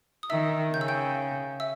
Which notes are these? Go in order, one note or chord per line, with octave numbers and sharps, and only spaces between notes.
D#6
D#3 E5 E6
C#3 G6
E6
G5 G6
E5 E6